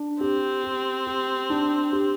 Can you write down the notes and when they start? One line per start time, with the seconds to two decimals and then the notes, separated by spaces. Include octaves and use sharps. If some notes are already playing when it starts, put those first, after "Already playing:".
Already playing: D4
0.21 C4 G4
0.64 G4
1.07 G4
1.50 D4
1.93 G4